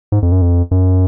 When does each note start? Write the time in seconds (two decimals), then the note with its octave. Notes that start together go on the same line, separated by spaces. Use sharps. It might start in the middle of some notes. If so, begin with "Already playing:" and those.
0.12 G#2
0.22 F2
0.32 F#2
0.42 F2
0.71 F#2